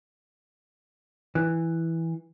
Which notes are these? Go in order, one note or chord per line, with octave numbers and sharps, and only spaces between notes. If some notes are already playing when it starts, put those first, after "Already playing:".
E3